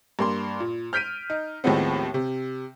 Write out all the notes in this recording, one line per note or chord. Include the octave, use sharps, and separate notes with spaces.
G2 A#3 C6
A#2
F6 G6 B6 D7 D#7
D#4
D#2 A2 F3 G#3 B3 C4
C3